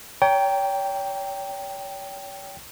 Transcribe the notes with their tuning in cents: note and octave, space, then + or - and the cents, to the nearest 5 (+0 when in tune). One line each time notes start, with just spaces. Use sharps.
C#5 +35 G5 +0 A#5 +0